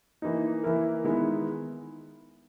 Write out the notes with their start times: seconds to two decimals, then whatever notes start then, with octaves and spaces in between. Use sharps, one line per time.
0.22 E3 A#3 D#4
0.64 E3 A#3 E4 A#4
1.04 D#3 G#3 B3 E4